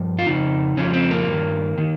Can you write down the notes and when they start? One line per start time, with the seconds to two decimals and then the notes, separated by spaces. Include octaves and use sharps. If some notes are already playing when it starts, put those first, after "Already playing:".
Already playing: G2 F3
0.18 F4
0.27 F2 C#3 D#4
0.77 F2 C#3 F3 C#4
0.94 C4
1.11 A#3
1.27 G2 D#3
1.78 D#3